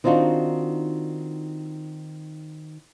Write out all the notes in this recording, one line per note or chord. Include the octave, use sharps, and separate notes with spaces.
D#3 C4 D4 D#4 F4 F#4